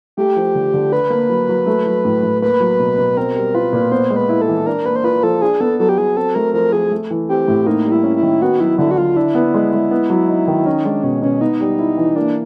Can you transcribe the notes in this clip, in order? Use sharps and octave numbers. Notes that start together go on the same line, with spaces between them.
A3 G4
F3
D3
D3
D4 B4
A#3
F#3
F#3
A3
F#3
A2
A2
A#3 B4
F#3
B2
B2
C4 A#4
G3
F4 B4
A#2
B3 C5
G#3
B4
E4
A4
E3
D4 A#4
A#3 B4
C5
F4 B4
F3 A4
D4 G#4
B3 A4
F#3 A4
G4
F#3 G#4
C4 A4
A3 A#4
F3 A#4
F3 G#4
A3
E3
C4 G4
A2
A#3 D#4
G3
E4
C#4
E4
D#3
B3 F#4
F#3 E4
D3 E4
F#4
D3 F4
D4 E4
B3
G#3
G#3
B3
F#3
D#4
D#3
C#4 D#4
G#3 D4
B2 C#4
B2 C#4
B3 D#4
G3
E4
E3
A#3 D4